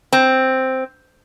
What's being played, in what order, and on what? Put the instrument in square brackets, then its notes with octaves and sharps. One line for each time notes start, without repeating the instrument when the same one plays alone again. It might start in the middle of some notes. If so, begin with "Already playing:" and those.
[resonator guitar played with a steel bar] C4